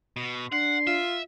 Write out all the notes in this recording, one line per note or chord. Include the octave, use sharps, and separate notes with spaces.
B2
D4 F#5 C6
F4 E5